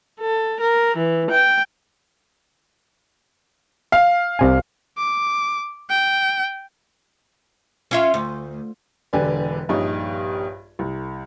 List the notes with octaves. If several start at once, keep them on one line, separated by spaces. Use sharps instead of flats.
A4
A#4
E3
G5
F5
C2 C3 G#5
D6
G5
C#4 F4 E5
D2
E1 D3 G4 B4 D5 G#5
A#1 G2 D#4 C#5
C2